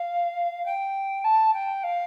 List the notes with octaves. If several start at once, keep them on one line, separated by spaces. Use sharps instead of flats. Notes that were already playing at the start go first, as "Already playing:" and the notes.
Already playing: F5
G5
A5
G5
F5